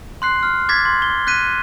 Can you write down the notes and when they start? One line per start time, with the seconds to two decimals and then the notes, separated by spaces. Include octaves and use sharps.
0.22 C6 F#6 C7
0.43 F6
0.69 D6 G#6 A6 B6
0.85 C6
1.02 G7
1.27 F#6 G6 B6 D#7